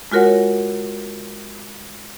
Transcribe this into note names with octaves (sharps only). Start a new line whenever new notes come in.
G#3 F4 F#4 A#4 C#5 F#5